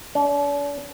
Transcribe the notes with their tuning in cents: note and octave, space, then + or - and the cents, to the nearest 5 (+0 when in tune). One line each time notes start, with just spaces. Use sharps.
D4 -45